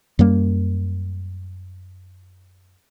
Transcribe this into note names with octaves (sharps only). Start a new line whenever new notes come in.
F#2 G3 A#3